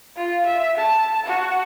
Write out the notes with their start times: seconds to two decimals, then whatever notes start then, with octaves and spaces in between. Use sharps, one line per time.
0.17 F4
0.46 E5
0.77 A5
1.26 F#4